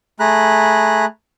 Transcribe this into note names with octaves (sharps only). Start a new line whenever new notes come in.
A3 G#4 A#5 B5 F#6